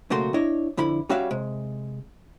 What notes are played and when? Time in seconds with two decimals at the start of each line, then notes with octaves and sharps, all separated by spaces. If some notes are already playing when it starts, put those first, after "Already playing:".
0.10 B1 C#3 A3 A#3 F#4 C6
0.34 D4 E4 C#5 D#5
0.77 F2 D3 E4 B5
1.09 G3 C#4 F#4 C#5 E5 F5
1.31 C3 G#3